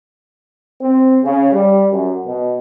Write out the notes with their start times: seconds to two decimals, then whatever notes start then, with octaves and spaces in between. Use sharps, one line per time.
0.81 C4
1.24 C#3
1.52 G3
1.91 F#2
2.26 B2